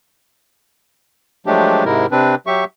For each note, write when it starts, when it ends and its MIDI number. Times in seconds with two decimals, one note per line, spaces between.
1.46 1.84 53
1.46 1.84 54
1.46 1.84 56
1.46 1.84 57
1.46 1.84 62
1.46 1.84 67
1.85 2.06 44
1.85 2.06 48
1.85 2.06 56
1.85 2.06 64
1.85 2.06 70
2.11 2.35 48
2.11 2.35 60
2.11 2.35 62
2.11 2.35 71
2.47 2.64 54
2.47 2.64 67
2.47 2.64 76
2.47 2.64 85